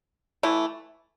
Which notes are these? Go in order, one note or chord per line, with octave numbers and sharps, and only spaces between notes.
E3 A3 E4